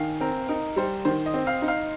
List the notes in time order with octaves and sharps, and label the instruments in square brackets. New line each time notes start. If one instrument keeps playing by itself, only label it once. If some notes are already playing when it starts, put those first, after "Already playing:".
Already playing: [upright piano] D#3 [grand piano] F5 G#5
[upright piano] C4 [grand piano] A#4
[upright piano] D#4 [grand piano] A#4
[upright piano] G3 [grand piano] C5
[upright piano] D#3 [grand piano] C5
[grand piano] D#5
[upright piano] C4
[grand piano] F5
[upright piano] D#4
[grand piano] F5